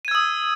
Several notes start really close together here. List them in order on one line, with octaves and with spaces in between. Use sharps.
D#7 G#6 E6 D#6